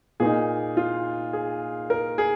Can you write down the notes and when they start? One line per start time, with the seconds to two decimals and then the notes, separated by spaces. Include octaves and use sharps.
0.20 A#2 A#3 D#4 G#4
0.77 F4
1.33 G#4
1.90 A#4
2.18 G#4